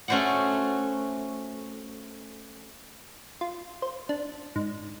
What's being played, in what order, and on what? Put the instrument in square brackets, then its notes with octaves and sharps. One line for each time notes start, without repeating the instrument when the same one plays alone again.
[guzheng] A3 C#4 F#4 C5 D5 F#5
[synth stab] F4
C5
D4
G#2